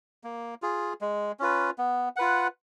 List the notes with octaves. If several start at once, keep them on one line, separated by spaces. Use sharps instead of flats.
A#3
F4 G#4
G#3
C#4 F4 B4
B3
F4 B4 F#5